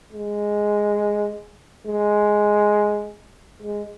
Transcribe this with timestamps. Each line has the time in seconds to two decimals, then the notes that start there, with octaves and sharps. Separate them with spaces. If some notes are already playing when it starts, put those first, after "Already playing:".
0.12 G#3
1.87 G#3
3.62 G#3